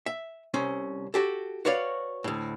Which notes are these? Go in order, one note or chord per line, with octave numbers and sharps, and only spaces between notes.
E5
C2 C#4 C5
F#4 G4 A4
F#4 B4 C#5 D5 F5
D2 A2